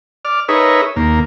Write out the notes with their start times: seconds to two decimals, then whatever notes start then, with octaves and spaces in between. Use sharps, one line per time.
0.25 D5 F6
0.49 D#4 G#4 A#4 B4 C#5 E5
0.96 D#2 A#3